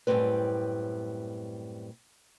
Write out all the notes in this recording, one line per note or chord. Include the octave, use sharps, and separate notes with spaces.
F#2 A2 G3 A#3 C4 B4